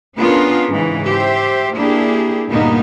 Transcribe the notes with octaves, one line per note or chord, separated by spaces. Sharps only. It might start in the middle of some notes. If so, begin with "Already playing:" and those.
B3 C#4 D4 F4 G#4 A#4
G#2 C#3 E3
G4 C5 E5
A#3 D4 E4 G4 G#4
D2 G2 A#2 A#3 B3 D#4